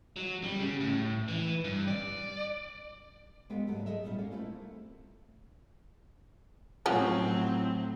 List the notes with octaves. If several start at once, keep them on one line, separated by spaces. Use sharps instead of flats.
F#3
G3
C#3
A2
E3
G2
D5
G#3 B3 G4 A4 F5 G5
G#2 C#3 F#3 G3 A3 A#3
G#4 A4 D#5 E5
A#2 G3 C#4 D#4 F4
A#3 C#4 F5
A3 A#3 C4 E4 F4 A4
A2 F3 F#3 C4 C#4 F#4